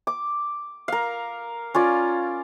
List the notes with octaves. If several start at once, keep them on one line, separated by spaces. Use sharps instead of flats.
D6
A#4 F5
C#4 F4 D5